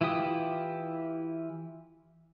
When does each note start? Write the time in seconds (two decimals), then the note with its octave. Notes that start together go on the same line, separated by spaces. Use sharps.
0.01 E3 E4 F4 G4 D#6